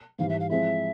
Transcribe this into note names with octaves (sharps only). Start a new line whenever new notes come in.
G#2 E3 G3 F5
E5
F5
F3 G#3 C4 E4 E5